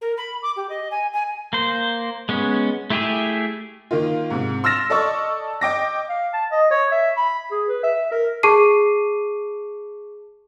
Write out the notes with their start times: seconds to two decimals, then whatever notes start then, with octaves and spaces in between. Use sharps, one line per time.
0.01 A#4
0.17 B5
0.42 D6
0.56 G4
0.69 D#5
0.91 G#5
1.13 G#5
1.53 A#3 C5
2.29 G#3 B3 C#4
2.90 A3 E4 G4 G#4 E5
3.91 D#3 A#3 F4
4.30 G#2 C3
4.64 C6 E6 F6 A6 A#6 E7
4.90 A4 D5 D#5 A5 C#6 E6
5.61 D#5 G5 D6 A#6
6.09 F5
6.33 A5
6.51 D#5
6.71 C#5
6.92 E5
7.17 B5
7.51 G#4
7.68 B4
7.83 E5
8.12 A#4
8.43 G#4 A5 C#6 D6 C7 D#7